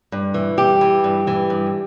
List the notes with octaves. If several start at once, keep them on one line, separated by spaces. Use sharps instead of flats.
G2
E3
G2 G4
E3
G2
E3
G2